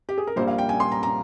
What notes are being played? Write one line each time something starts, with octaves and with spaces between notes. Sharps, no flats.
G4
G#4
A#4
A#1 A#2 G3 A#3 C5
F5
G5
G#5
C6
A#5
A#5